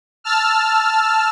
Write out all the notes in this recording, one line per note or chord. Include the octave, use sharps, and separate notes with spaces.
A5 E6 F6